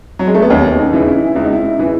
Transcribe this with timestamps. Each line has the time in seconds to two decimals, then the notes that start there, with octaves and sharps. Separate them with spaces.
0.19 F#3
0.27 G#3
0.35 A3
0.42 B3
0.50 D#2 C#4
0.79 D#4
0.93 C#3 E3
1.07 E4
1.35 C#2 E4
1.44 D#4
1.53 E4
1.79 C#3 E3